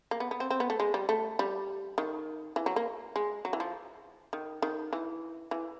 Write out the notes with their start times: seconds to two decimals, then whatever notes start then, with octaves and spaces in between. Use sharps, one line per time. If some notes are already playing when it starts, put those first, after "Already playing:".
0.11 A#3
0.20 B3
0.31 B3
0.40 C4
0.51 C4
0.60 B3
0.70 A3
0.80 G#3
0.94 G3
1.09 A3
1.39 G3
1.98 D#3
2.56 E3
2.66 F#3
2.76 A#3
3.16 G#3
3.45 F#3
3.53 E3
3.60 F3
4.33 D#3
4.62 D#3
4.93 E3
5.51 E3